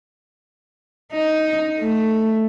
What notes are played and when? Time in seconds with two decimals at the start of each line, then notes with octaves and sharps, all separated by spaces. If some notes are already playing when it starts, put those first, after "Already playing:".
1.12 D#4
1.78 A3